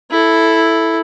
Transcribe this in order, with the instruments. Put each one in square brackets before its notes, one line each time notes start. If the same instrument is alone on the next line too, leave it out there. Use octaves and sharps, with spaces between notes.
[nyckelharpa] E4 A4